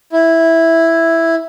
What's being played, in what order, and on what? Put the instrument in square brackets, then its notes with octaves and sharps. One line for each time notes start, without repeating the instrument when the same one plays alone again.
[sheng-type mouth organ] E4